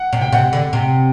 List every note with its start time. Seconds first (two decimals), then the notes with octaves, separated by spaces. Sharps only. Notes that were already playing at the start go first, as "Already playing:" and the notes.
Already playing: F#5
0.13 C3
0.22 G5
0.32 C3 F#5
0.53 D3
0.73 C3